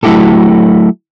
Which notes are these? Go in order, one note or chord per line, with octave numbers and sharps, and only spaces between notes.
F#3 A3 E4 F#4 G4 A4